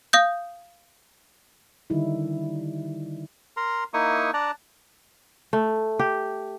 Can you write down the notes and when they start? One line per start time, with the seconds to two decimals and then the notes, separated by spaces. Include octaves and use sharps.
0.13 F5 D#6 G6
1.90 D3 D#3 G3 D#4 E4
3.57 A#4 A#5 C6
3.94 A#3 D#4 E4 C#6 D#6
4.34 D4 D5 A5 A#5 F#6
5.53 A3
5.99 G4